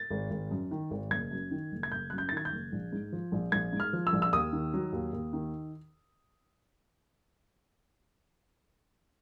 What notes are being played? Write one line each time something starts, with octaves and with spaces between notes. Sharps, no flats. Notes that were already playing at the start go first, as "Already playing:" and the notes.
Already playing: A6
G#1
G#1
F#2
D#3
G#1
F#1 G#6
F#2
D#3
F#1
G#6
F#1 G6
F#2 F#6
G6
A6
D#3 G#6
G6
F#1
A#1
G#2
F3
A#1
A#1 G#6
G#2
F6
F3
E6
A#1
E6
D#2 D#6
D#3
F#3
D#2
D#2
D#3